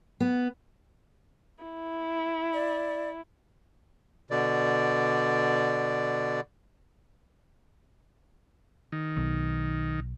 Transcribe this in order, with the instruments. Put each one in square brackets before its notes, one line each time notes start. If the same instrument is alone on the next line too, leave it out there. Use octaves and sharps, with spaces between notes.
[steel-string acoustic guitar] B3
[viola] E4
[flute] D5
[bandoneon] B2 D3 D5
[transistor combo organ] D#3
[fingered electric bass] B1